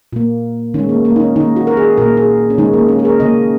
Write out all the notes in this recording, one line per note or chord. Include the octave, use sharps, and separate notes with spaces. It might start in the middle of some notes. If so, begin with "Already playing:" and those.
A#2 A#3
D#3 G#3 C#4
A#3
A#3
D#4
C#4
D#3 A#3 D#4
F#4
A#4
G#4
A#2 A#3 A#4
G#4
C#4
D#3 G#3 D#4
A#3
C#4
G#4
A#4
C#3 A#3 D#5